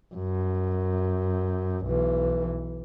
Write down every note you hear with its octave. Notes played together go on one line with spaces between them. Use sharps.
F#2
B1 E3